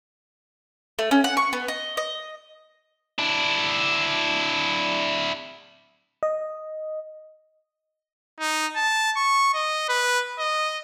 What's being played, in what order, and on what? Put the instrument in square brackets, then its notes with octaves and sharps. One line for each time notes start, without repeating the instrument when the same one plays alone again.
[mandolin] A3
C#4
F#5
C#6
B3
D#5
D#5
[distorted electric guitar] D4 E4
[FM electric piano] D#5
[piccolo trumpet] D#4
A5
C#6
D#5
B4
D#5